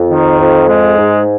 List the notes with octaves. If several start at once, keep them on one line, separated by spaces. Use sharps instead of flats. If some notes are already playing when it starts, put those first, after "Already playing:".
Already playing: F2
D#3
F2
G#3
G#2